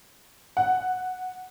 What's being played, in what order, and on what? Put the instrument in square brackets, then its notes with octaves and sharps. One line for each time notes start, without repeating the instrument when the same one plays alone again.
[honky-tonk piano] F#5